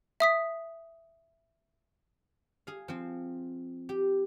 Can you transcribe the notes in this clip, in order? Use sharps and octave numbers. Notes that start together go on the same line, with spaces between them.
E5 D#6 B6
G#4 F5
F3 C4
G4